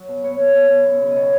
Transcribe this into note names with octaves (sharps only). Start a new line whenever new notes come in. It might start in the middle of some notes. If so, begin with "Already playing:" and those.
Already playing: F#3
B2
B3 C#5
B3
B3
B3
F#2
C#3
D#5
B2 C#5